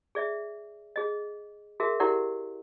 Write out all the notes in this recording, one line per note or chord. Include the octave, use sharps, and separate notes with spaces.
G#4 D5 E5
G#4 D#5
F#4 G#4 A#4 E5
E4 G4 A#4 D5 F#5